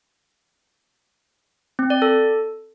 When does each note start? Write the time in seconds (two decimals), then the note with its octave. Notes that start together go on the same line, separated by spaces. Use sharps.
1.79 C4
1.90 D5
2.02 A4